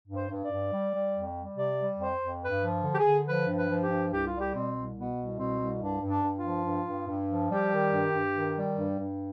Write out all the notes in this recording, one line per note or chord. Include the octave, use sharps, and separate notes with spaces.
G2
C5
G2
D5
G2
G3
G3
F2
G3
C3 D5
G3
F2 C5
F2
G2 B4
F3
D3
G4
G#4
D3
F3 B4
G2
B4
F3
G4
G2
C2 G4
F4
G3
G4
B2 C4
C2
B2 B3
C2
B2 C4
C2
G2 D4
G2
D4
G2
F4
F3
G2
G2
G2
F3
G3 G4
D#3
G2
G2
D#3
G3
G2
G2